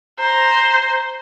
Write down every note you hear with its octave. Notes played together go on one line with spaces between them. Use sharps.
C5 A#5